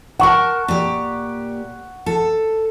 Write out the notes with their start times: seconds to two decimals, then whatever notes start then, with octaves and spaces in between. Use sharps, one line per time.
0.19 A#4 F#5 A5 C#6
0.68 A#2 G4
2.06 A4